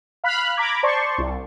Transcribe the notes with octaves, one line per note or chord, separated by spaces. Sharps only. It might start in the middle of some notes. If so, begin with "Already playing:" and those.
F5 B5 F6 F#6
A#5 B5 D6 G#6
C5 D5 A5 C6 C#6
C2